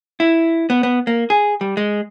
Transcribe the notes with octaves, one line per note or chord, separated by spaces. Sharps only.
E4
B3
B3
A#3
G#4
G3
G#3